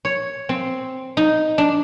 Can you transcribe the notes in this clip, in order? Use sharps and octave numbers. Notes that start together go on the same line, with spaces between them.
C#5
C4
D#4
D4